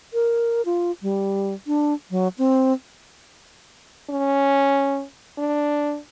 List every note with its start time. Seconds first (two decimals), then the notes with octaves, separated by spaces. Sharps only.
0.14 A#4
0.65 F4
1.02 G3
1.67 D4
2.11 F#3
2.38 C4
4.10 C#4
5.38 D4